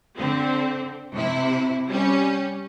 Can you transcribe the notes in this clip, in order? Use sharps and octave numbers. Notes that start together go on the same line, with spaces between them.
D3 C4
C3 E4
G3 C#4